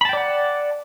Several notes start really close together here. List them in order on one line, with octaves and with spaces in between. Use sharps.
B5 A5 G5 D5 F#5